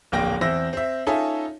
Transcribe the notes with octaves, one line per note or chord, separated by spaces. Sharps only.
D1 A#1 A#3 G5 A#6
E2 C4 E5 E6 A#6
C4 E5
C#4 D#4 F4 A4 E5 G#5